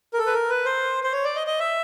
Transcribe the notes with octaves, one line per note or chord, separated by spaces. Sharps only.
A#4
A4
B4
A#4
B4
C5
C5
C#5
D5
D#5
D#5
E5